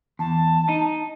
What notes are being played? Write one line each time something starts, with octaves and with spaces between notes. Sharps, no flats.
E2 A5
D#4